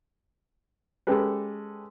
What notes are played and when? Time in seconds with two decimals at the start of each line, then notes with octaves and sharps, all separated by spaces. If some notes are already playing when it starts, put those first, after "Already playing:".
1.07 G#3 C#4 G4 A4 B4